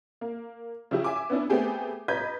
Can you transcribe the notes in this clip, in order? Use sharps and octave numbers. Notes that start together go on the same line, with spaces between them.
A#3
C#3 F3 C#4 E4 G4
E5 G#5 D6
B3 C#4 D4 E4 B4
A3 B3 C4 G4 G#4
B4 D#5 A#5 G6 G#6 B6